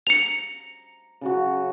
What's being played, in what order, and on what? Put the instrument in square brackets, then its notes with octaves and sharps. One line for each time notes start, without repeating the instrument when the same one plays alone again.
[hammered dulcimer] A#5 [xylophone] C#7 F7
[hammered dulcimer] C#3 F#3 F#4